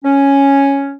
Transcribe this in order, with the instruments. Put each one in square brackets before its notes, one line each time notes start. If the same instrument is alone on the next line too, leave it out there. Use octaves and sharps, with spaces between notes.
[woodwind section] C#4